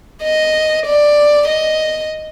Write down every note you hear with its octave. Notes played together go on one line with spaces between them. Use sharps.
D#5
D5
D#5